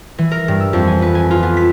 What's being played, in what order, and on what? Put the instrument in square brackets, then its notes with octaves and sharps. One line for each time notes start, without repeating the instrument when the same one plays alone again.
[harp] E3
A#4
G2
E6
F2
G#5
B4
G#5
F4
B3
B6